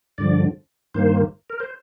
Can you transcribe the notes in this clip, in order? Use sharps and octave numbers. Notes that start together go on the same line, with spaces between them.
G2 D3 F3 D5
G2 D#3 A#3 C5
A#4
C5